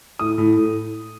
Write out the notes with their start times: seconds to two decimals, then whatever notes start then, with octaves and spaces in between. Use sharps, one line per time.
0.19 A2 D#6
0.38 A2
0.57 A2